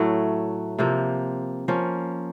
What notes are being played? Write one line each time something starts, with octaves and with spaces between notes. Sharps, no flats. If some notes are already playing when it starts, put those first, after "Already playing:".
Already playing: A2 F#3 A3
C3 F3 A#3
F3 A#3 C#4